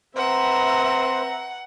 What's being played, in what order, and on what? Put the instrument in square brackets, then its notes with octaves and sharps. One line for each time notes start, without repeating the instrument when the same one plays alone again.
[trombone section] C4 B4 [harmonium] C5 [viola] E5 A#5 [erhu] F#5